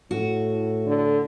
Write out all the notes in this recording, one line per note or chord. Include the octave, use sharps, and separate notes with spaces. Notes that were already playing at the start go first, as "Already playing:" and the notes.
A2 F#4
D3